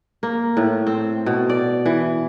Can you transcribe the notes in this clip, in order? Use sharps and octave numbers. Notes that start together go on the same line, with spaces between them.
A#3
A2
C4
B2
D5
E3